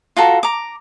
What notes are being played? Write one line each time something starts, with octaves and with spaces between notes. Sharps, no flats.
F4 F#4 A4 A#5
A#5 D6